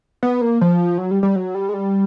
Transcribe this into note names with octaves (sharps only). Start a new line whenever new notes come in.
B3
A#3
F3
F#3
G3
G3
F#3
G3
G#3
G3